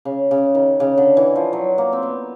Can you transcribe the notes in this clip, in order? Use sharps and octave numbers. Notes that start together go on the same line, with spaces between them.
C#3
C#3
D#3
C#3
D3
E3
F3
F#3
A#3
C4
B3